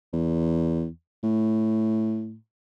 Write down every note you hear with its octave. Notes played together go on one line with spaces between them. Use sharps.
E2
A2